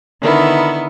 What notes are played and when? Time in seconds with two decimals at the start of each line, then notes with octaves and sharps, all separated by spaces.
0.22 D3 D#3 B3 E4